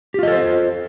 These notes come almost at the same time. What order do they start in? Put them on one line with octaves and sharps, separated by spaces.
G4 F4 D#5 A4 C5